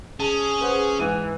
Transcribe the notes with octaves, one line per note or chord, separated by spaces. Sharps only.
C#4 G#4 A5 D#7
B4 C5 F#5
G#2 E3 D#7